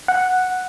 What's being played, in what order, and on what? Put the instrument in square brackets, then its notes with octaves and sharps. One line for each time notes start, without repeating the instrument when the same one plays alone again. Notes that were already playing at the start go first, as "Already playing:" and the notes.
[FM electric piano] F#5